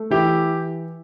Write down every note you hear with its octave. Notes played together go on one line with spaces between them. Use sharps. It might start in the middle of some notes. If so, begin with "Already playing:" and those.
Already playing: A3
E3 E4 G4